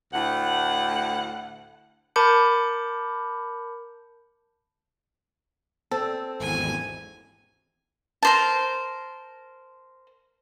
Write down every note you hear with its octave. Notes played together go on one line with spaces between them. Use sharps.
D2 A2 F#5
A#4 A5 B5 D6 G6 C#7
C4 A4
G#1 E2 G#5
A#4 C5 A5